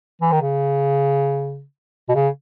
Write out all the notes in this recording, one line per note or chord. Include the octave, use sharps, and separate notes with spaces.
E3
D#3
C#3
B2
C#3